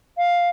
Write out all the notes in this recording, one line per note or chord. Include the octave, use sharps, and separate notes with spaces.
F5